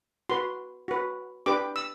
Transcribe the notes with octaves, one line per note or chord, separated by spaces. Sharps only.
F#4 B4 C6
F#4 B4
D4 G4 B4 D6
E6